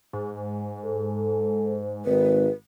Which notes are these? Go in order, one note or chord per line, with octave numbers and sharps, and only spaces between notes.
G#2
A4
G#1 D#3 B4